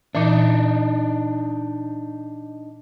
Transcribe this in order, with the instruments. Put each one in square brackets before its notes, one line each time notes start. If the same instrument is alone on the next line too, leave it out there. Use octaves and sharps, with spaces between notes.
[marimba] A#2 E3 [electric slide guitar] D4 D#4